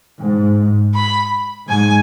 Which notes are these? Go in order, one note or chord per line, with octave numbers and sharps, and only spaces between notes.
G#2
B5
G#2 G#5